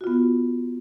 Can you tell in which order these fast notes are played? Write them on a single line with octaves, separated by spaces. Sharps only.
F#4 F4 B3